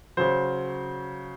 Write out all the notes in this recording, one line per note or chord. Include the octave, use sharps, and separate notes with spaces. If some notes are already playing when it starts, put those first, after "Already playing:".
C#3 F#3 C5